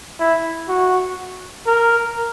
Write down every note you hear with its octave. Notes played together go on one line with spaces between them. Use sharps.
E4
F#4
A#4